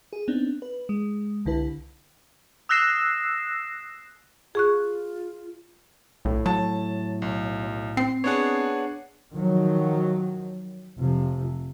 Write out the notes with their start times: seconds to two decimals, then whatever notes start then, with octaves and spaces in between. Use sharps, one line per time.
0.13 G#4
0.28 B3 C4 D4 D#4
0.62 B4
0.89 G#3
1.45 C2 D3 E4 B4
2.69 D#6 E6 F#6 A#6 C7 E7
4.55 F4 G#4 C#6 F#6
6.25 B1 A2
6.46 F#3 A5
7.22 B1
7.97 C4 C7
8.24 B3 D4 G#4 C#5 F#5
9.32 D#3 F3 F#3
10.99 F1 C3 F3